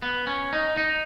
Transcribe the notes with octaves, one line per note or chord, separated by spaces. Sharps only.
B3
C#4
D#4
D#4